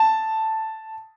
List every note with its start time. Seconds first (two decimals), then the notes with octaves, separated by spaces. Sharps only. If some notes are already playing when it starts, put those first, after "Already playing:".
Already playing: A5